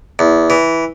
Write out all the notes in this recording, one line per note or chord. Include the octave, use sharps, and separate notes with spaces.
E2
E3